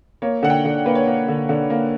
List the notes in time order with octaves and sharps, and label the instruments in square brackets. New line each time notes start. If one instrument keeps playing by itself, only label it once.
[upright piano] A#3 C#5
D3 F#5
G5
D3
A#3 B4
C#5
A#3
D3
D3
A#3